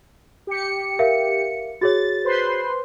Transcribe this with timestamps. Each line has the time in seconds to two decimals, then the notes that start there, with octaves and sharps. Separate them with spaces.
0.47 G4 C#7
0.99 A#4 E5 F5
1.81 F#4 G#4 C#5 A6
2.25 B4 C5 C6